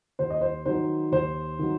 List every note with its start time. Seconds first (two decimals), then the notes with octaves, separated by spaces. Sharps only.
0.19 D#2 C5
0.30 D#5
0.41 C5
0.66 D#3 F#3 C5
1.12 D#2 C5
1.59 D#3 F#3